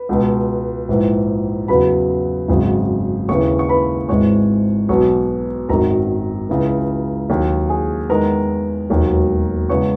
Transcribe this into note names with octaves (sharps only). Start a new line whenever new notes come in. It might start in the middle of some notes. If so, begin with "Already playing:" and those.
Already playing: B4
C#2 B2 G#3
A#1 G#2 E3
E2 C#3 F#3 B4 B5
G#1 F#2 C#3
D#2 C#3 E3 C#5 C#6
C#6
B4 B5
G#1 G#2 E3 G#3 C#5 C#6
B1 B2 F#3 C#5 C#6
G#1 F#2 D#3 F#3 A#4 A#5
C#2 C#3 E3
D#2 D#3 F#3
G#4 G#5
E2 D#3 G#3 A#4 A#5
E1 D#2 D#3 F#3
E2 C#3 G#3 C#5 C#6